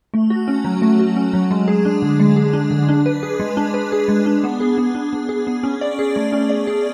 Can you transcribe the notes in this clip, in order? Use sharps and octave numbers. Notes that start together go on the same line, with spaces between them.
A3
F#4
C#4
F#3
A3
F#4
C#4
F#3
G#3
G#4
D4
D3
G#3
G#4
D4
D3
D4
B4
G#4
G#3
D4
B4
G#4
G#3
D4
B3
G#4
B3
D4
B3
G#4
B3
C#4
D5
G#4
A3
C#4
D5
G#4